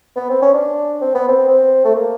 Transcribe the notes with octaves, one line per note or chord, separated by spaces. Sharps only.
B3
C4
C#4
D4
C4
B3
C4
C4
A3
A#3